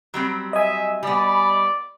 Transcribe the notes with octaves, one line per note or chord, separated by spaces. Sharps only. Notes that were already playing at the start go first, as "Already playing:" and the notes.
F#3 G3 C4
D#5 E5 G#5
G3 B3 D5